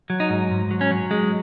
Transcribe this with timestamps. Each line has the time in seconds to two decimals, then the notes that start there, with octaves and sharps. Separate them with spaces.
0.10 F#3
0.20 D#4
0.30 G#2
0.51 G#2
0.71 F#3
0.81 C#4
0.91 F#3
1.11 G#3